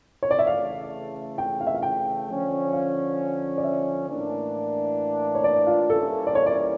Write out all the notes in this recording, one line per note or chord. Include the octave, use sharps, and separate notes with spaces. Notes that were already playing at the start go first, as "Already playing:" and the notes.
C#5
D5
E5
C#3 E3 A3 F5
G5
F5
E5
F5
G5
D3 F3 C#4
F5
D5
E5
A2 E3 A#3 D4
C#5
D5
F4
E3 G3 A#3 C#4 E4 A4
D5
C#5
D5